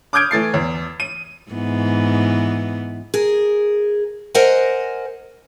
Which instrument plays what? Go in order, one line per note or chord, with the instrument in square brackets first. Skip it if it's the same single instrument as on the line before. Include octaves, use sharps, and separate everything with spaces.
[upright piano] D6 D#6 F6 G6 G#6 D7
E3 A3 A6 C7
E2
D#7
[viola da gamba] G#2 E3 B3
[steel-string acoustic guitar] G#4 A#4
A#4 C5 D#5 F#5 G#5